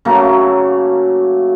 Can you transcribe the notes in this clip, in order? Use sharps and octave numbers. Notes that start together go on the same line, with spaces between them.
C#3 F#3 A3 A#3